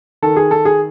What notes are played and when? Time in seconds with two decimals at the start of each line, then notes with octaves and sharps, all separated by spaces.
0.22 D#3 A4
0.36 G#4
0.51 D#3 A4
0.65 G#4